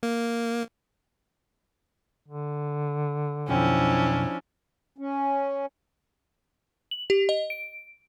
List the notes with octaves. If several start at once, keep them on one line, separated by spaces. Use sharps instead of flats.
A#3
D3
B1 F2 F3 C#4 D4 E4 G5
C#4
F#7
G4
D#5
D7